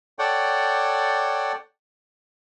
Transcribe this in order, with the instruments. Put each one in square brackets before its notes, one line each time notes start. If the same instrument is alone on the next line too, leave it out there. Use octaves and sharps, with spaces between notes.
[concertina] A4 C#5 D5 F#5 G5